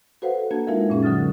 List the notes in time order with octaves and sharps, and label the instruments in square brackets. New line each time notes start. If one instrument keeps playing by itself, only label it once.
[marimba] F#4 A4 B4 C5 F5 F#5
A#3 D4 F#4 A5 G#6
G#3 D#4 F4 A#4 E5 F5
F#2 A#2 C#4 G#4
D3 F#3 D#6 F6 A6